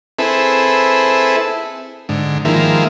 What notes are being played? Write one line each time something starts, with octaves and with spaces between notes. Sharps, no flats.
C4 E4 G#4 A4 B4
G#2 D3
D#3 F3 G#3 A#3 E4